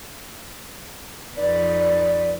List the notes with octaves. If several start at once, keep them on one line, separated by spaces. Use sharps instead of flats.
F2 D#4 B4 D5